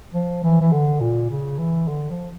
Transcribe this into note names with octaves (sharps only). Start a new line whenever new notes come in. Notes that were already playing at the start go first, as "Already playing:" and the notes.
F3
E3
E3
D3
A#2
C#3
E3
D3
F3